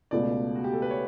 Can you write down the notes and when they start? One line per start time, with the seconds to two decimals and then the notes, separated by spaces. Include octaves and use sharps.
0.11 C#2 B2 A3 D5
0.55 F#4
0.64 G4
0.74 A4
0.82 B4
0.90 C#5